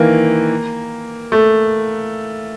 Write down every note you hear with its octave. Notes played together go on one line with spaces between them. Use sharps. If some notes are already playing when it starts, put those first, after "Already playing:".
Already playing: D#3 E3 A#3
A3